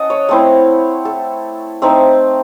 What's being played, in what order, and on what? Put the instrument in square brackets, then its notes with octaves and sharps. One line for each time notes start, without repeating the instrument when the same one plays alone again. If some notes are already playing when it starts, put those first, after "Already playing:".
Already playing: [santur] C#4 D#5 F#5 A5
C#5
A3 C4 E4
A4
A3 C4 D#4